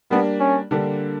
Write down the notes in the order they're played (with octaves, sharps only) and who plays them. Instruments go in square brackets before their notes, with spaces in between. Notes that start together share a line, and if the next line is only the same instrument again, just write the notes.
[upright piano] G3 A#3 D4 [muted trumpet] B3
[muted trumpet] C#4
[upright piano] D3 G3 A#3 D4